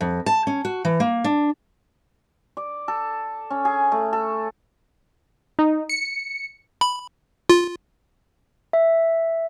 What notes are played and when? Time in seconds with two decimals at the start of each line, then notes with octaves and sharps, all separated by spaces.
0.01 F2
0.26 A5
0.47 C#4
0.65 F#4
0.85 E3
1.00 A#3
1.24 D4
2.57 D5
2.88 A4
3.50 C#4
3.65 G#4
3.92 A3
4.13 A4
5.59 D#4
5.89 C#7
6.81 B5
7.50 F4
8.73 E5